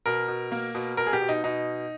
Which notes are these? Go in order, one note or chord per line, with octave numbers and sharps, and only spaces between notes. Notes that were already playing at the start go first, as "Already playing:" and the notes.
B2 A#4
B2
A#3
B2
B2 A#4
G#4
G4
B2
D#4
B2 D#4